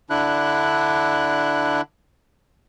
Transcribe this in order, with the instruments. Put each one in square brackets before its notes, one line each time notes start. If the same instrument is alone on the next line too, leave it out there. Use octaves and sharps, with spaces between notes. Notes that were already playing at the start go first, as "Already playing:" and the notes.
[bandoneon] D3 D4 E4 F#6